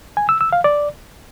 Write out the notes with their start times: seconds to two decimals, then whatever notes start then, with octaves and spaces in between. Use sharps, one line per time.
0.17 G#5
0.29 E6
0.41 E6
0.53 F5
0.64 D5